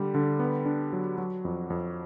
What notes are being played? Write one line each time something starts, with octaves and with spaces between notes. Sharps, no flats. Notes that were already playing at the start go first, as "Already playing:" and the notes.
Already playing: D3 G3
D3
B3
D4
F#3
F#3
F2
F2